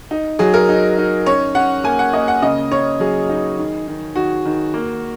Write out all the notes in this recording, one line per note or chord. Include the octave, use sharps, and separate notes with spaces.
D#4
F#3 G#4
A#4
D#4
D#4
C#4 C#5
C#4 F#5
A#3 G#5
F#5
A#3 D#5
F#5
C#3 D#5
C#3 C#5
F#3 G#4
D#4
D#3
D#3
D#3 F#4
D#3
A#3